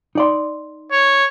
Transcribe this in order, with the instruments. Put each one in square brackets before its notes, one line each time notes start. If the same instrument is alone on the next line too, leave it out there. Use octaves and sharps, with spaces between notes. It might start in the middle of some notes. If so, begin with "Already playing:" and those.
[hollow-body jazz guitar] D#4 D5 C6
[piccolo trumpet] C#5